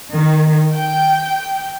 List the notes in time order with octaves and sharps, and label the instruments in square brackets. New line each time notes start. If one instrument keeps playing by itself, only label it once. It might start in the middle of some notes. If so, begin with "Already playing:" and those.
[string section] D#3
G5